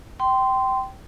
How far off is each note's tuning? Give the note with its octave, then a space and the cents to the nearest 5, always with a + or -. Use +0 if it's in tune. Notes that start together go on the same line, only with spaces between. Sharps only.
G5 -15 C6 -15